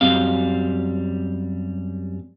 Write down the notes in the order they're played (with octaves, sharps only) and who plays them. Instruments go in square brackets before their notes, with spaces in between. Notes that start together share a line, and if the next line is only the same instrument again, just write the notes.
[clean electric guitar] F#2 G3 C4 F5